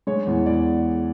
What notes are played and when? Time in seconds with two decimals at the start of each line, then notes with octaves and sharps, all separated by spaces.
0.07 G#3 C#5
0.27 E2
0.46 E2 D5